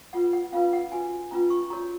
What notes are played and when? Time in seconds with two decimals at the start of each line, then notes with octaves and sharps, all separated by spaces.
0.13 F4 B4 F#5
0.33 F#5
0.52 C#4 F4 B4 F5
0.73 F#5
0.92 F#4 B4 G#5
1.31 C#4 F4 B4 A#5
1.50 C#6
1.70 F#4 A#4 C#5 A#5